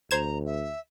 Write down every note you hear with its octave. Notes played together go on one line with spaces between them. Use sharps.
D2 C5 A#5 G#6 E7
E5